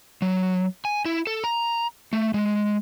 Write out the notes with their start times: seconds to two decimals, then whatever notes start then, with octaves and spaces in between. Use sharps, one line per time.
0.22 F#3
0.85 G#5
1.05 E4
1.27 A4
1.44 A#5
2.13 A3
2.34 G#3